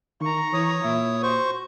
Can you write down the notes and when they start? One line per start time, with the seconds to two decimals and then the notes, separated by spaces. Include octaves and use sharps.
0.21 D#3 A#5 C#6
0.53 E3 C#5 D#6
0.84 A#2 E4
1.23 F#4 C5 C#6